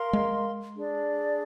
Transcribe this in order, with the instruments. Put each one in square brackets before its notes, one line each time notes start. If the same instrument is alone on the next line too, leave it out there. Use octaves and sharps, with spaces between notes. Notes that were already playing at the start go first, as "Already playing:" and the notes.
Already playing: [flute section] A#4 F5 C6
[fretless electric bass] G#3
[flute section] D4 G#4 D5